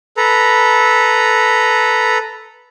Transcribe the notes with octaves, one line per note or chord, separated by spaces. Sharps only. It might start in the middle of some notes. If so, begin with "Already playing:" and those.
A4 B4 A#5